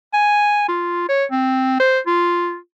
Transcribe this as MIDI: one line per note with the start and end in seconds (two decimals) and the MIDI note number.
0.14 0.66 80
0.68 1.06 65
1.09 1.25 73
1.32 1.78 60
1.80 1.99 72
2.07 2.57 65